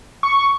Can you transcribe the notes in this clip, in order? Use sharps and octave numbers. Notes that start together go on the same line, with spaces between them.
C#6